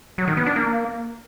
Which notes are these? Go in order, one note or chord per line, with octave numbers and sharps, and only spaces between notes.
F#3
D#3
B3
D4
A#3